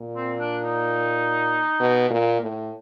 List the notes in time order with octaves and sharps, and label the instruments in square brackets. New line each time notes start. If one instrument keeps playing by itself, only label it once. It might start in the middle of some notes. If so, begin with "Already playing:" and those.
Already playing: [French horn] A#2
[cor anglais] C4
D4
D#4
[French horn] B2
A#2
A2